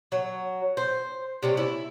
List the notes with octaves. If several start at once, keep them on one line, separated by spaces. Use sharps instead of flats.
F#3
C5
C3 G3 C#4
E4